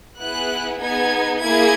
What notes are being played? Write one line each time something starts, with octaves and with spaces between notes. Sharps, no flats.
B3 E4 G#4 F#6
B3 D#4 G#4 G#6
A#3 E4 G#4 G#6